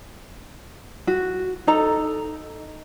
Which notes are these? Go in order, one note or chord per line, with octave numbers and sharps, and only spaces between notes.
F#4
D#4 A4 A#5